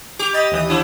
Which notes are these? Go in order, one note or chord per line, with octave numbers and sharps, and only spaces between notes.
G4 D6
D#5 B5 D6 A6
D#2 E3 D#6
F3 D4 E4